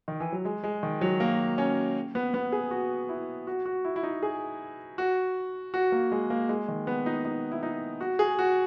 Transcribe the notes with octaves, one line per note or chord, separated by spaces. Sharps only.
D#3
E3
F#3
G#3
G#3
D#3
F#3
A#3
C#4
B3
B3
G#4
F#4
E4
F#4
F#4
E4
E4
D#4
G#4
F#4
F#4
A#3
G#3
A#3
G#3
D#3
B3
D#4
D#4
E4
D#4
F#4
G#4
F#4